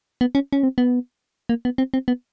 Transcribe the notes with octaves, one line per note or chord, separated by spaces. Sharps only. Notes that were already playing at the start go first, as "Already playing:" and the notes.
B3
C#4
C#4
C4
B3
A#3
B3
C4
C4
B3